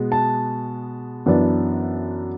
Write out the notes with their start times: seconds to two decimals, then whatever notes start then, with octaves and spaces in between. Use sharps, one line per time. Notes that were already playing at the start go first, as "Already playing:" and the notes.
Already playing: B2 G#3 B3
0.12 A5
1.26 F#2 E3 B3 D4